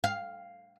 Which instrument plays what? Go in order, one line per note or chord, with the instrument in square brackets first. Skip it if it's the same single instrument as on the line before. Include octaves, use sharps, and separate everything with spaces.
[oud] F5